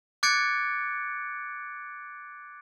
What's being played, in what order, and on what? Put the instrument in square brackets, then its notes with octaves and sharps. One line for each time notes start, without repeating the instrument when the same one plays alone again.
[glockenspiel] D6 F#6 G#6 A6 C#7 D7